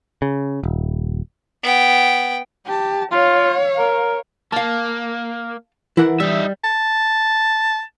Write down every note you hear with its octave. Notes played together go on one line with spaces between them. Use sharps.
C#3
D#1
B3 G5
G4 A5
F4 C#5 F5
A#4
A#3 F5 A5
E3 E4 A#4 F#5
G3 D#4 E5
A5